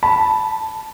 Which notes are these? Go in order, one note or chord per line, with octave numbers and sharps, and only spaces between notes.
A5 B5